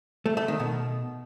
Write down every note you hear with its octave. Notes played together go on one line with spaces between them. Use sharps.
A3
A3
D#3
B2